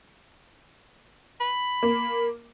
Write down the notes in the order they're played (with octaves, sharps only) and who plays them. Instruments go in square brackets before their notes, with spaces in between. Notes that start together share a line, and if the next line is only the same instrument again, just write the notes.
[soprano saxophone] B5
[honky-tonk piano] A#3